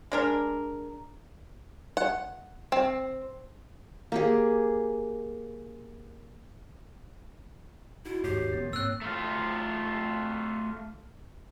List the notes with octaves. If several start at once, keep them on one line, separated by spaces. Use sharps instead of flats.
G#3 D4 A#4
F#5
C4
A#3 G4 G#4
D#4 E4 F#4
D#2 G#2 G4 C#5 G6 C7
D#1 A#1 A#3 B3 C#4 A6
G#2 C4 C#5 E6 F#6 C7
A3 F4